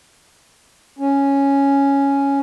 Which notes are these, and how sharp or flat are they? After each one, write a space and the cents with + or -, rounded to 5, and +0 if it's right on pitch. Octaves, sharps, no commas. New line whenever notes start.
C#4 +0